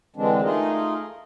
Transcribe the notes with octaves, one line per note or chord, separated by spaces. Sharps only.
D3 E3 G#3 C4 D4
A3 D#4 F4 G#4 A#4 D#5